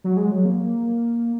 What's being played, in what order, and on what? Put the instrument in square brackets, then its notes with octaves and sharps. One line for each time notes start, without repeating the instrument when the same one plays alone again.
[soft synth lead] F#3
G#3
F#3
A#3